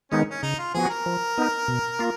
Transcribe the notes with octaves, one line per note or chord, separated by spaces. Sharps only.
D#3 G#3 B3 C#4 D#4
C#4
C#3 D#4
F4
F3 B3 F#4 G#4
A#4
F3
B3 D#4
B2
A#3 F4